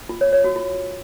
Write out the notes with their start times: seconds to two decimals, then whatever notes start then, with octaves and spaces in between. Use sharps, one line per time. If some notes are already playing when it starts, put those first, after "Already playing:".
0.09 F4
0.21 C#5
0.33 C#5
0.44 F#4
0.56 F4